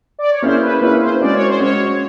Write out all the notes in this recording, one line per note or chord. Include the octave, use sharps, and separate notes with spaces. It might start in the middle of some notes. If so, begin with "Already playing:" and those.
D5
C#5
A#3 C#4 E4 G#4 C5
B4
A#3 C#4 E4 G#4 B4
C5
G#3 C#4 F#4 D5
C#5
C5
G#3 C#4 F#4 C#5